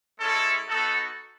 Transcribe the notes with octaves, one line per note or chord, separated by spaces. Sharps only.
G#3 C#4 E4 A4
B3 D#4 F#4 A4